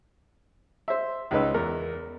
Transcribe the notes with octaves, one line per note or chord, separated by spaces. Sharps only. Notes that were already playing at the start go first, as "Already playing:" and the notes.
C5 E5
C#2 D#4 B4 E6
E2 A#4